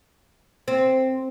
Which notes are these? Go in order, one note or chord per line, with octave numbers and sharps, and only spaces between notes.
C4